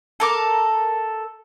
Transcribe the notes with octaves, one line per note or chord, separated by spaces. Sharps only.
A4 A#4 D6